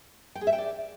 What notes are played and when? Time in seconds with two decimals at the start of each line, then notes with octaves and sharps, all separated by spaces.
0.35 G5
0.41 G#4
0.47 E5
0.53 G5
0.58 D5